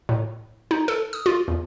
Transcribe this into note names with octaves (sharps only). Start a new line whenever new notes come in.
A2
D#4
A4
D#6
F4
E2